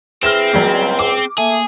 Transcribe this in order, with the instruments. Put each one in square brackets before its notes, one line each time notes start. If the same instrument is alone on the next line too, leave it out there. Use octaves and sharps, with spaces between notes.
[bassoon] E3 [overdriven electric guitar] C4 [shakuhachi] G#4 [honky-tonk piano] F6 A#6 E7
[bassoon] C#2 [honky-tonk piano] F#3 G3 A#3
[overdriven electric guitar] C4 [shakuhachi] G#4 [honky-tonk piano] D6
[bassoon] A3 [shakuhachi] A#3 [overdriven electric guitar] G#4